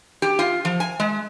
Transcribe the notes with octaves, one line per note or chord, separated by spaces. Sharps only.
G4
F4
F3
G#5
G#3